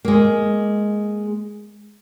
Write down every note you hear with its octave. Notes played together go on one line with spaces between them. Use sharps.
G#3 A#3